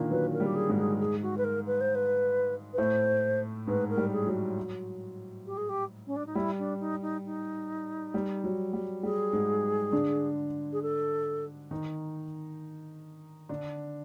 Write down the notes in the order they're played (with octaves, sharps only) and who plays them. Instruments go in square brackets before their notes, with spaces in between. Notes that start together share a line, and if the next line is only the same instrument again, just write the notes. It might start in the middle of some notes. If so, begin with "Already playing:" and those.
Already playing: [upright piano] A#2 D3 D#3 A#3 D4 D#4
[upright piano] F#3 [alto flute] B4
[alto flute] A#4
[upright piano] G3
[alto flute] G4
G#4
[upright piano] G#2 G#3
[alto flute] G#4
G#4
F#4
B4
A#4
B4
C5
B4
B4
[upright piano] A2 A3 [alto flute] C5
[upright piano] G#2 G#3 [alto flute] B4
[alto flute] A#4
[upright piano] G3
[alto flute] G#4
[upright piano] F#3
[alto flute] G4
G#4
G4
C#4
D4
D#4
[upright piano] G3 [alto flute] E4
[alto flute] D4
D#4
D#4
D#4
[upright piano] G3
F#3
G3
[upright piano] G3 [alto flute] G#4
[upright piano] G#2 G#3
D3 D4
[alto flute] G#4
A4
[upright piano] D#3 D#4
D3 D4